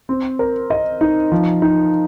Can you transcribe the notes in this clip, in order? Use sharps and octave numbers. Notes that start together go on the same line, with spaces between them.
C4
A#4
D#5
D#4
F3
D#4